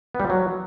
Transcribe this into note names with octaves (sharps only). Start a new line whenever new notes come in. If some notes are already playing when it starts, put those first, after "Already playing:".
B3
G3
F3
F#3